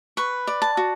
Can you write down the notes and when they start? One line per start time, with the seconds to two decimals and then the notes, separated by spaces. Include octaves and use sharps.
0.17 B4 C#6
0.47 D5
0.62 A5
0.77 F#4